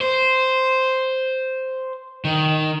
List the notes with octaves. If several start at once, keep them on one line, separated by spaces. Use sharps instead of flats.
C5
D#3